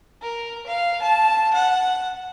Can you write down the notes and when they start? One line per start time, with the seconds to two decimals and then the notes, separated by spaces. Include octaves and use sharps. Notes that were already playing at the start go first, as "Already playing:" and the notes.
0.22 A#4
0.67 F5
1.02 A5
1.53 F#5